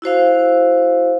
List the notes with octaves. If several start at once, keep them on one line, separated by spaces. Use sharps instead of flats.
E4 F#4 C5 F5